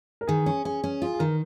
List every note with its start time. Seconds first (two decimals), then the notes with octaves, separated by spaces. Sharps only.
0.21 A#4
0.27 D#3 G#4
0.46 C#4
0.65 C#4 G#4
0.84 C#4
1.02 F4 G#4
1.14 G#4
1.19 D#3 A#4